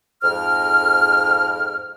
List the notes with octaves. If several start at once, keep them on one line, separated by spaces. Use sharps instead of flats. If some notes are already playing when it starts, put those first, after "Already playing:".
F2 G#2 F6